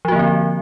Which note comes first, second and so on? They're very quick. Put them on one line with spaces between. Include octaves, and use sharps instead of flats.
F3 F#4 A#3 D3 C4